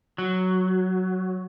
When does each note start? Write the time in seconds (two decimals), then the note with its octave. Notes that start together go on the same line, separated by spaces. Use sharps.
0.18 F#3